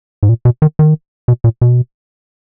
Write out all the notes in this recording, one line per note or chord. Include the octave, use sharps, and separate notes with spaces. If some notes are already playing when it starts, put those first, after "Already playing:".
G#2
A#2
B2
D#3
D#3
B2
A#2
B2